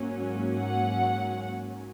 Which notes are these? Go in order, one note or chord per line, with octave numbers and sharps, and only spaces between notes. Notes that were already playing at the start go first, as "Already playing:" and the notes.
Already playing: G#2 F#3 A#3 C#4
F#5